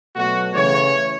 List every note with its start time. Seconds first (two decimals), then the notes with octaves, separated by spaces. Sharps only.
0.16 B2 F#3 A3 F#4
0.54 C#3 E3 A3 C#5